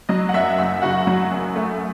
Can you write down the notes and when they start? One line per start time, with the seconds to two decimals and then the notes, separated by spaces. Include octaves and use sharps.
0.09 F#3 D#5
0.29 F#5
0.34 F#2 E5
0.58 F#1 E5
0.82 C#3 F#4 F#5
1.07 F#3
1.31 F#2
1.56 A3